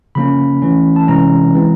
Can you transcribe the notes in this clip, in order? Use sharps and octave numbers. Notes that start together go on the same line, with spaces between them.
C#3 F3 A#3 C#4 B5
E3 A3 C#4
A5
C3 E3 G#3 C#4 A#5
E3 G#3 C4